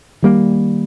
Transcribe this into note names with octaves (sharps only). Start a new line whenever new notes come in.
D#3 G3 A#3